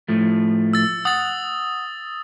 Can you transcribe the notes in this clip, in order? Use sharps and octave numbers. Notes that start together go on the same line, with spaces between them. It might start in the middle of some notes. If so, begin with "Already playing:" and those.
A2 F3 A3
E6 A6
F#5 D#6 A6